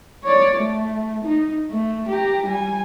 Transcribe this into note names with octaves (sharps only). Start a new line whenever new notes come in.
C#5 D5
A3
D#4
A3
G4 A#5
G3 G#5